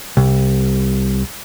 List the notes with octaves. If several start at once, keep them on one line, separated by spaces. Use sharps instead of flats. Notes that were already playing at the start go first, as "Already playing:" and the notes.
C2